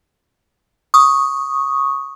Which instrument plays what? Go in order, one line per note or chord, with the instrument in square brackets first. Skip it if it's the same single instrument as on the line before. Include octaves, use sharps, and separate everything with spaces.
[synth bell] C#6 D#6